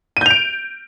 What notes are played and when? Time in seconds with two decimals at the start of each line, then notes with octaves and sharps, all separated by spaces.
0.17 D#7
0.21 G6
0.26 F7
0.31 D7